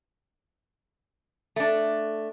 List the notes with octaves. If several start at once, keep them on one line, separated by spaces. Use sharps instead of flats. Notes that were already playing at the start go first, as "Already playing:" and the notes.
A3 D4